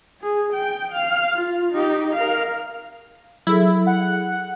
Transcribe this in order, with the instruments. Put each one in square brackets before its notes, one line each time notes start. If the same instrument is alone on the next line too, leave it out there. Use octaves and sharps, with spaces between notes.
[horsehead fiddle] G#4
G5
F5
F4
D#4 G4
A#4 F5
[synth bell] F#3 G#4 A4 [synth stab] E4
[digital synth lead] F#5